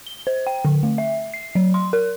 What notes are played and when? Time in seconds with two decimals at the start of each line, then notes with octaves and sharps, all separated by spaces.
0.07 G7
0.27 C5
0.47 G5
0.65 D3
0.83 A3
0.98 E5
1.34 C7
1.55 F#3
1.74 C6
1.93 A#4